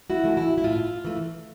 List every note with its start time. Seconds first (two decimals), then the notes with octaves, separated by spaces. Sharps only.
0.10 E4 F#4
0.23 E3 A3
0.37 E4
0.58 E4
0.64 A2 F4
1.05 E3 A3